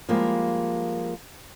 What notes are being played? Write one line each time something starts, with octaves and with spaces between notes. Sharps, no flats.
F3 G3 G#3 A#3